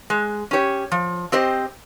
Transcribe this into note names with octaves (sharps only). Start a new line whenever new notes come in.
G#3
C#4 G4 C#5
F3
C4 G4 C5 D#5